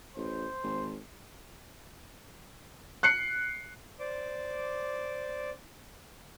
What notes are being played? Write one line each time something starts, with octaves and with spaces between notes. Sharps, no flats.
A1 C5
G#1
F#6 C7 C#7
C5 D5 D6